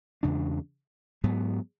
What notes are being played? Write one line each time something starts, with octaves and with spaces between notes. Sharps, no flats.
E2 C#3 G#3 D4
G#2 F#3 B3